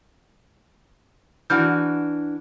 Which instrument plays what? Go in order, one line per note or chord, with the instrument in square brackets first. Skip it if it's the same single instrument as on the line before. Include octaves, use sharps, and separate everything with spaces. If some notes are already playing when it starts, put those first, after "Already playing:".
[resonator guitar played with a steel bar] E3 D4 F#4 [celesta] F6 G6